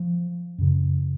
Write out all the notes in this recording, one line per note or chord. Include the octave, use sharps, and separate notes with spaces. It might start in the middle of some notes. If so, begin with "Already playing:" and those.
Already playing: F3
F#2 C#3